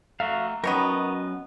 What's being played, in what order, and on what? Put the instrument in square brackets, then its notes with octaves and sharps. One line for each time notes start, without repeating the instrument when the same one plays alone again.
[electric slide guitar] A3 A4 A#5 [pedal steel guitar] F#4 E5 F5
[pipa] B2 D#3 B3 [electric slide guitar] F#3 C#4 [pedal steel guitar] A#4 C#5 D#5